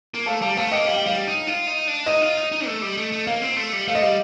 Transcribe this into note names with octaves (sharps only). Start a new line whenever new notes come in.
A#3
A3 F5 A5
G3 F5 A5
A3 F5 A5
A#3 D#5 G5
G3 F5
G5
G3 F5
D#4
F4
D#4
D4
D#4 D#5
F4
D#4
D#4
A3
G3
A3
A3
A#3 F5
C4
A3
G3
A3 F5
D#5
G3 F5